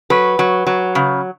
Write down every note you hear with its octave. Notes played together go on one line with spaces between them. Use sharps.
F#3 B4
F#3
F#3
C#3